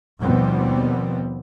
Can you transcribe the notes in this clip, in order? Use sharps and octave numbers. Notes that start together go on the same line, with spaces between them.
D#2 B2 F3 G3 B3 C4